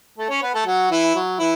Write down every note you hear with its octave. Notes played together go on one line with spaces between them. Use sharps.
A3 A4
C#4 C#5
B3 B4
A3 A4
F#3 F#4
E3 E4
F#3
E3 E4